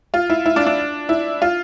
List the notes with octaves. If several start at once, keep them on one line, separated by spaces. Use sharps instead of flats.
F4
E4
E4
D4
D4
E4
F4